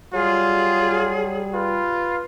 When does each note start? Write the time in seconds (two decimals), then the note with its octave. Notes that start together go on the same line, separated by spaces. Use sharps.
0.14 F#3 G3 F4 G#4
1.54 F4 B4